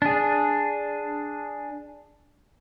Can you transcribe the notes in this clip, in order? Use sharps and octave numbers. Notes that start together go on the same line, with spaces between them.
D4 G#4